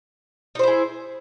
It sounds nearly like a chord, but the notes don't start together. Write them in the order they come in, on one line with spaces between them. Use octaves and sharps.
D#4 C5 E4 G#4